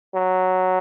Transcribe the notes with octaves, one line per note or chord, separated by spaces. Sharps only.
F#3